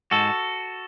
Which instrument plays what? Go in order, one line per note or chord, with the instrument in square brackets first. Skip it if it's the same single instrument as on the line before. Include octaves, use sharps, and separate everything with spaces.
[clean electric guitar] G#2 F#4 A4